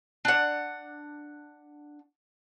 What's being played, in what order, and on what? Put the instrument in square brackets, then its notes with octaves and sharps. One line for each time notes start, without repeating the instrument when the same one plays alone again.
[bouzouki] D4 F#5